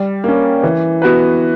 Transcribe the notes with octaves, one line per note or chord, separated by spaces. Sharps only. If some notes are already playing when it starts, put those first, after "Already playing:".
Already playing: G3
A#3 C#4
E3
B3 F#4 B4